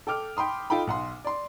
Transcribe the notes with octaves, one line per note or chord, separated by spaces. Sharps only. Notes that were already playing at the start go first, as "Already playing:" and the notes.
A4 G5 D6 F6
G5 B5 C6 D#6
D#4 F4 A4 G5 B5
B1 F#5 C6
D5 C6